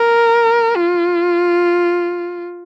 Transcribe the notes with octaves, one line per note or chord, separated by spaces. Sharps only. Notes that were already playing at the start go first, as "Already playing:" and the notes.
Already playing: A#4
F4